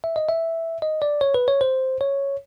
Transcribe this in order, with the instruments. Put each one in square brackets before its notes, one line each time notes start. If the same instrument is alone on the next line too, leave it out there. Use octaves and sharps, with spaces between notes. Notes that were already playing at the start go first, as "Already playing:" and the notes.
[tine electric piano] E5
D#5
E5
D#5
D5
C#5
B4
C#5
C5
C#5